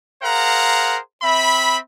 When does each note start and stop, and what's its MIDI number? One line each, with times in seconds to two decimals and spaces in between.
0.23 0.98 68
0.23 0.98 70
0.23 0.98 72
0.23 0.98 77
0.23 0.98 78
0.23 0.98 82
1.22 1.78 60
1.22 1.78 76
1.22 1.78 83